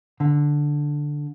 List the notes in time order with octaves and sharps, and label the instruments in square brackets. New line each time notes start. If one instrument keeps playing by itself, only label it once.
[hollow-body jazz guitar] D3